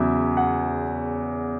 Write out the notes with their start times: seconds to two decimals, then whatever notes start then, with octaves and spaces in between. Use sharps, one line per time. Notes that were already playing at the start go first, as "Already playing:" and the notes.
Already playing: E2 C#3 F#3 E5
0.37 F#5